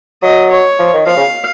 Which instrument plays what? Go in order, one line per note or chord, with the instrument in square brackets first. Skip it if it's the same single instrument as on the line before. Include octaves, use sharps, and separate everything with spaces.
[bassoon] F#3 [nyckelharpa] D#5
[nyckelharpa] C#5
[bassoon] F3
D#3
[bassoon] F3 [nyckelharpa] F5
[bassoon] C#3